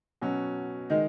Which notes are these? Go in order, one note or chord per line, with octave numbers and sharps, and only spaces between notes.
B2 F#3 C#4
D#3 G#3 D#4